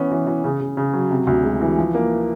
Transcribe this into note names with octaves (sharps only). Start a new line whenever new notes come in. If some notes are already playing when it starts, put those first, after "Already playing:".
Already playing: E3 B3 C#4
E3
E3
C#3
C#3
C#3
F#3
C3
D2
G#3
E3
F3
A#3